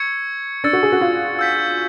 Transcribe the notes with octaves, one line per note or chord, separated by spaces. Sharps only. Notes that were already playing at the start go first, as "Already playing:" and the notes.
Already playing: C#6 E6 G#6 C#7
D4 E6 A6 C#7
F#4
G#4
F#4
F4
E6 G6 B6